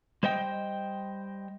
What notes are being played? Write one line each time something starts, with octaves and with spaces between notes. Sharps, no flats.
G3 C5 D#5 G5